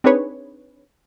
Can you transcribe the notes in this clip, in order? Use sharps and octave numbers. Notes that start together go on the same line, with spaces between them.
C4 D4 D#4 G#4 B4 C#5